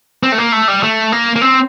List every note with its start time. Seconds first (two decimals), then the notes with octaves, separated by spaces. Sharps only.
0.23 C4
0.32 A3
0.38 A#3
0.52 A3
0.68 G3
0.83 A3
1.12 A#3
1.36 A#3
1.41 C4